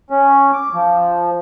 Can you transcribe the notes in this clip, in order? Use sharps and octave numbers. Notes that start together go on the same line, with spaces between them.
C#4
D6
F3